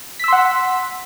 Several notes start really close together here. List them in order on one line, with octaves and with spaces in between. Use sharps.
B6 E6 C6 F#5